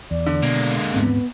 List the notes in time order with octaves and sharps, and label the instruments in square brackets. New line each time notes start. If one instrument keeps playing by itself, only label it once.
[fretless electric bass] E2 [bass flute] D5
[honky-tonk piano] D3
[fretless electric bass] B2 [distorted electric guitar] G#3 A#3
[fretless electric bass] D#1 G#2 C4 [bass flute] B3